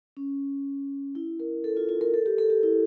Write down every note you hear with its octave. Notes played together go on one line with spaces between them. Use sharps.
C#4
E4
A#4
A4
F4
F4
A#4
A4
G4
A4
G4
E4